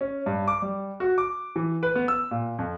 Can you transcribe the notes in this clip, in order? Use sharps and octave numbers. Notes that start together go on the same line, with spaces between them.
C#4
G2
D6
G3
F#4
D6
E3
B4
B3
E6
A#2
F2